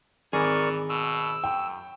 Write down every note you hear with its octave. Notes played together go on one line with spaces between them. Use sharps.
G#1 E3 G#4 A#4 D5 C#6
B2 E6
F#2 G5